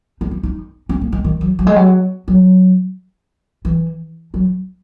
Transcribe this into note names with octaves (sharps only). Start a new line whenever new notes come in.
D#4
E4
D#4
C#4
A#3
G#3
D#3
F#3
F#3
G#3
F#3
F#3
E3
F#3